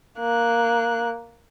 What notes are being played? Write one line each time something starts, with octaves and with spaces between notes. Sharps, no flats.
A#3 F#6